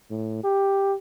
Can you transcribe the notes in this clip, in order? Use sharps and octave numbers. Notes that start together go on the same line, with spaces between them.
A2
G4